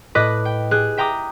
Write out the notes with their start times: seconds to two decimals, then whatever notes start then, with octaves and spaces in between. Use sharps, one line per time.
0.15 A2 B4 D#5 D6 F#6 B6
0.45 G5
0.71 G4 G#4 F#6
0.98 E5 G5 A#5 D6 D#6